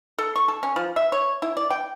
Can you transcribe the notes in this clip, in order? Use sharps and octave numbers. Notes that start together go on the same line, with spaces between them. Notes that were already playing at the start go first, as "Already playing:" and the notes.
A4
C#6
A4
C#4
F3
E5
C#5
E4
D5
G5